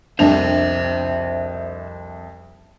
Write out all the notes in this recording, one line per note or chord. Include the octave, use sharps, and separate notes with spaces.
C2 F2 D4 C5 E5 F7